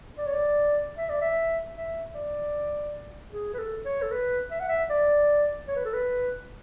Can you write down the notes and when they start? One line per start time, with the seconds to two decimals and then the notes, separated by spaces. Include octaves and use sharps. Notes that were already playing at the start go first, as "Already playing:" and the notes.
0.18 D5
0.26 C#5
0.33 D5
0.97 E5
1.09 D5
1.21 E5
1.76 E5
2.15 D5
3.32 G#4
3.54 B4
3.58 A4
3.85 C#5
4.02 A4
4.11 B4
4.51 E5
4.60 F#5
4.68 E5
4.90 D5
5.68 C#5
5.76 B4
5.85 A4
5.93 B4